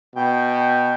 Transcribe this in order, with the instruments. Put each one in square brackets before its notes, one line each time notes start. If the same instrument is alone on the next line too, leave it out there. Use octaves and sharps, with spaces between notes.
[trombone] B2 [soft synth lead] G5